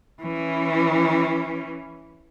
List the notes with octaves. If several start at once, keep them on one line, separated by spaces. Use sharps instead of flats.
E3 C#4